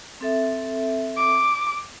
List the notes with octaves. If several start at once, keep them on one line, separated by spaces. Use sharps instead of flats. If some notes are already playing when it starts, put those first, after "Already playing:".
C4 A4 E5
D6